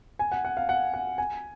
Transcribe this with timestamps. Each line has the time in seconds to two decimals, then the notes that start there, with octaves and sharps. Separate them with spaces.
0.19 G#5
0.32 F#5
0.45 F#5
0.57 F5
0.69 F#5
0.94 F#5
1.18 G#5